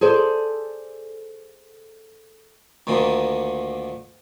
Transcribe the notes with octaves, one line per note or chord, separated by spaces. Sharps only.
G#4 A4 C5 D5
D2 A#2 D3 D#3